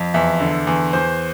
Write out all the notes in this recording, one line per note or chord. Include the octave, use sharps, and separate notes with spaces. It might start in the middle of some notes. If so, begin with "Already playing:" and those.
Already playing: F2
E2 E5
D3
E2
E2 C5